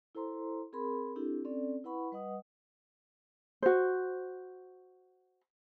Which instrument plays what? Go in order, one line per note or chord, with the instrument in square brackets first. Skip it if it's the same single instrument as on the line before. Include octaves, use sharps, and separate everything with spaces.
[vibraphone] E4 A4 C5 A#5 C6
C4 G#4 A#4 B5 C6
C4 D4 E4 G4 A4
C4 C#4 A4 D5
E4 B4 F#5 B5 C#6
G3 B4 D#5 F#5 D#6
[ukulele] F#4 C5